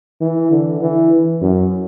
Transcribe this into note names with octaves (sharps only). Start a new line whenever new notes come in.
E3
D3
E3
F#2